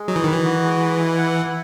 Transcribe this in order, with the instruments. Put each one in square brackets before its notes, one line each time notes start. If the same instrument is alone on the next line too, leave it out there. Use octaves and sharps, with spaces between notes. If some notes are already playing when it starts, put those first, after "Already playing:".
Already playing: [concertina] G#3
[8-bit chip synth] F#3 [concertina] D#4
[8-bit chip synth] E3
[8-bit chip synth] D#3 [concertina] B4
[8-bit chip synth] E3
[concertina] F#4
G#3
B4
E4
F#5
E4